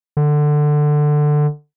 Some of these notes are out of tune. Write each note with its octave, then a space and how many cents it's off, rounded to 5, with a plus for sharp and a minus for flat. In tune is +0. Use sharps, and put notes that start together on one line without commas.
D3 +15